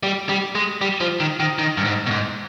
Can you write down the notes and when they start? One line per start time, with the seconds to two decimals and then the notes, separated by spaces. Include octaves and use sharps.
0.03 G3
0.29 G3
0.55 G#3
0.81 G3
1.01 F3
1.20 D#3
1.40 D#3
1.59 D#3
1.77 G2
1.85 G#2
2.07 B2
2.11 G#2